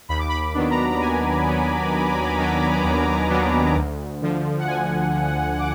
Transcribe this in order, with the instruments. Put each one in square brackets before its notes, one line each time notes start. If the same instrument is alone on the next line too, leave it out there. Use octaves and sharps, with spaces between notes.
[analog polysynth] D#2 B5
D6
B5
B5
D#3 F#3 B3 D4
A#5
A#5
D#2 G#5
D#3 F#3 B3 D4
D#2
D#3 F#3 B3 D4
D#2
D#3 F#3 B3 D4
D2
D3 F3
F#5
D2 G#5
D3 F3
D6